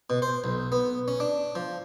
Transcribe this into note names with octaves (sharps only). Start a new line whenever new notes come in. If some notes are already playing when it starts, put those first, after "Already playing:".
B2
C5
B1
B3
C#4
D4
F3